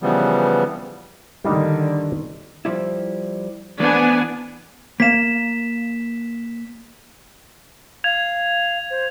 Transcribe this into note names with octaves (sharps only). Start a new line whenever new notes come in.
C#3 E3 F3 G3 B3
D3 D#3 G3 D4 D#4
F3 G3 E4
E3 A3 B3 D4 C5 G#5
A#3 F5 B6 E7
F5 G#6 F7
C5